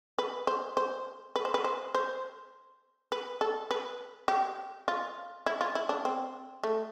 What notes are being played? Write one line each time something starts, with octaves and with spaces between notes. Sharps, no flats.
B4
C5
C5
B4
C5
B4
C5
C5
B4
A4
B4
G4
F4
E4
F4
E4
D4
C4
A3